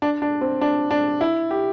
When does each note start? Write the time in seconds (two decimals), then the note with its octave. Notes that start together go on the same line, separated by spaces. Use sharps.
0.02 D4
0.22 D4
0.41 C4
0.61 D4
0.91 D4
1.21 E4
1.51 G4